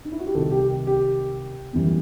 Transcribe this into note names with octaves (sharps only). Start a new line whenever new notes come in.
D#4
E4
F#4
G4
C2 C3 D#3 A4
G4
G4
F#2 E3 G3 B3